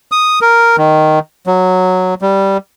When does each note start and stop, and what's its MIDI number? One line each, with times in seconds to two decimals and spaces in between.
0.12 0.39 87
0.41 0.76 70
0.77 1.19 51
1.47 2.15 54
2.22 2.57 55